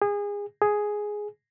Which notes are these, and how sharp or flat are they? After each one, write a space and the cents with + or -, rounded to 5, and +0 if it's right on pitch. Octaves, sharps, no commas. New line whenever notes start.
G#4 -25
G#4 +5